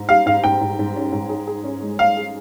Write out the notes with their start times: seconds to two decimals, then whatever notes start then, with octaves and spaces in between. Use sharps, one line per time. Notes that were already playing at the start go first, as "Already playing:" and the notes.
Already playing: G#2
0.09 G3 F5
0.26 G#2 F5
0.44 G#2 G5
0.61 G#2
0.79 G#2
0.96 C#4
1.12 G#2
1.29 G#4
1.47 G#4
1.64 C#4
1.82 G#3
1.99 G#3 F5
2.17 G#4